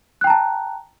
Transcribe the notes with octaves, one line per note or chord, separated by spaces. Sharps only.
G5 A5 A#5 F#6